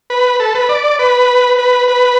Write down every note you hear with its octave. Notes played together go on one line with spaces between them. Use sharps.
B4
A4
B4
D5
B4
B4
B4